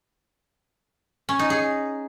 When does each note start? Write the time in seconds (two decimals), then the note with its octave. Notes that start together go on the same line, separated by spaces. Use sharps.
1.29 C#4
1.39 D#4
1.50 G#4